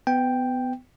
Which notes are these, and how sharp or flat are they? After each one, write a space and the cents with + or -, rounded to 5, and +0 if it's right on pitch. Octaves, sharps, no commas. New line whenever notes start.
B3 +25 G5 +0